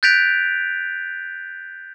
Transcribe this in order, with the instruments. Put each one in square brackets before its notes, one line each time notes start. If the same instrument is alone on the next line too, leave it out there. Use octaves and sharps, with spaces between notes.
[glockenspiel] F#6 G6 A6 B6 D7 F7